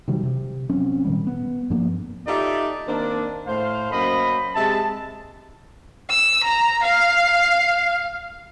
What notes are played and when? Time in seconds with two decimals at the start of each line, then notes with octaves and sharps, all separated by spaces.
0.08 C3 D#3 F#3 G3
0.23 C3
0.69 F#3 C4 C#4
1.05 A#2 D#3 G3
1.27 B3
1.70 G2 F3 A#3 B3
2.27 D#4 F4 G4 A4 D5 E5
2.88 D#3 A#3 C4 D4
3.47 A2 C5 F5
3.91 F#2 A#3 C5 D#5 B5
4.55 C3 G#3 E5 A5
6.10 E6
6.44 A#5
6.83 F5